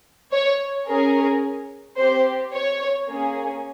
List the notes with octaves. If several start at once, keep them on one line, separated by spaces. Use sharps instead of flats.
C#5
C#4 G#4 A#4
C4 G4 C5
C#5
A#3 C#4 G#4